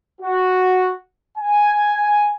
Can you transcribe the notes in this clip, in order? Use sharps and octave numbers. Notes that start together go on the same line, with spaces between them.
F#4
G#5